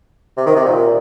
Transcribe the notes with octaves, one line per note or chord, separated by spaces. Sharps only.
C3
D#3
C3
A#2